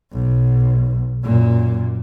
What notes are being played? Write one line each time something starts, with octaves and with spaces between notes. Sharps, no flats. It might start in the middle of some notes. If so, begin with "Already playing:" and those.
B1
F#2 A#2